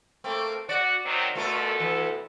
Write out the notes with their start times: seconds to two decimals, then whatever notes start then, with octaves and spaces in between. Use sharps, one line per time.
0.24 A3 A#3 C4
0.69 F#4 D5
1.05 D#3 F#3 C4
1.35 D2 B2 A3 F4 A4 A#4
1.80 E3